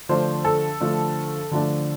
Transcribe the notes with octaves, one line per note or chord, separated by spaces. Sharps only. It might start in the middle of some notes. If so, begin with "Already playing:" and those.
D3 F3 A3 D4 C5
A4
D3 F3 A3 D4
D3 F3 A3 D4